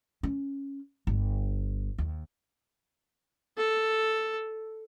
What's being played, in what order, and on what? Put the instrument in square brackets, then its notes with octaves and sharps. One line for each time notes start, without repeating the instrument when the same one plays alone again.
[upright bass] C#4
G1
D#2
[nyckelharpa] A4